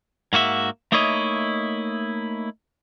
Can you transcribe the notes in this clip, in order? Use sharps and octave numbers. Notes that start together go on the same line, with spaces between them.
G#2 A#3 F#4 E5
A3 A#3 D#4 E4 C#5 D#5